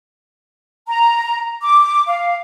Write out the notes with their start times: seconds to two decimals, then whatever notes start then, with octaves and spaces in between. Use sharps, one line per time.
0.87 A#5
1.62 D6
2.08 F5